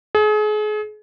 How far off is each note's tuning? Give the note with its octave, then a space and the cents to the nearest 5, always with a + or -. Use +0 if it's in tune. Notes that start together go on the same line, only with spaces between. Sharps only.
G#4 +35